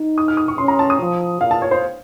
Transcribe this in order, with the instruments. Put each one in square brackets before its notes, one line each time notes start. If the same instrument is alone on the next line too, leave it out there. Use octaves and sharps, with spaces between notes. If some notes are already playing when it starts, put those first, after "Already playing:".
Already playing: [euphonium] D#4
[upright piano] D#6
F6
D#6
C#6
[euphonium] C#4 [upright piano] C6
[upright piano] A#5
A5
D#6
[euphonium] F3
[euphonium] A#2 [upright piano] F5
[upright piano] A5
C#5
C5